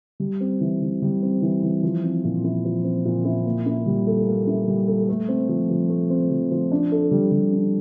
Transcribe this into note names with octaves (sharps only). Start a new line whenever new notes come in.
G3
C4
E3
E3
G3
C4
E3
E3
F3
C4
A#2
E4
F3
C4
A#2
E4
A#3
E4
G3
A4
A#3
E4
G3
A4
A3
C4
F3
F3
A3
C4
F3
F3
D4
A4
G3
G3
D4